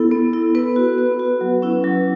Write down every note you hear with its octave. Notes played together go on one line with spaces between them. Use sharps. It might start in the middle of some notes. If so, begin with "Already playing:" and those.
Already playing: B3 E4 A4
B3
E4
B3 B4
F#4
B3
F#4
F#3
C#4 E4
F#3